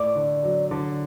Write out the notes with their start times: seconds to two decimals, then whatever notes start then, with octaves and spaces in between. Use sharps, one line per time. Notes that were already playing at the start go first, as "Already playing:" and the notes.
Already playing: A2 A3 D5
0.15 D3
0.43 F#3
0.71 D3